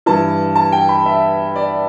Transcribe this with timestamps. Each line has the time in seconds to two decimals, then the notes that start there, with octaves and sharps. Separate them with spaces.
0.06 G2 E3 A5
0.55 A5
0.72 G5
0.89 B5
1.06 E5
1.56 D5